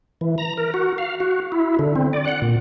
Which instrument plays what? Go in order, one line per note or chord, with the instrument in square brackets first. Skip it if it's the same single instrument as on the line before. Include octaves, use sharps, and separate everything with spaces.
[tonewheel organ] E3
A#5
A#4
F#4
F5
F#4
E4
D3
C4
D5
F#5
A#2